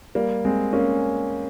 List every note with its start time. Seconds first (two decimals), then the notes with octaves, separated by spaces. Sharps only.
0.15 G3 A#3
0.45 G#3 C4
0.73 A#3 C#4